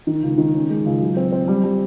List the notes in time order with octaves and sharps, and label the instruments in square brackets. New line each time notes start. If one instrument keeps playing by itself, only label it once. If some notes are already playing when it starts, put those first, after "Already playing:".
[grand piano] D#3
C#2
D#3
C#4
G#3
C#2
F#3
C4
C4
G3
G3